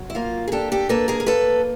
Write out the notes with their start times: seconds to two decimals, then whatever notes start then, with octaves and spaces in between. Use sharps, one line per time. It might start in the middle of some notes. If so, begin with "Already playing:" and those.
Already playing: F#3
0.10 E4
0.15 A#3 F4
0.48 G#4
0.52 D4 G4 A4
0.72 G4 A4
0.89 A#3 A4 B4
1.08 G#4 A#4
1.20 A#4
1.26 A#3 A4 B4